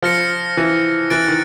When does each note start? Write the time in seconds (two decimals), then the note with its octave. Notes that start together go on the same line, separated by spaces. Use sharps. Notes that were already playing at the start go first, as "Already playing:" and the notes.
0.02 F3 F6 A#6 C#7
0.57 E3
1.10 E3 F#6 A6 D7
1.28 D#3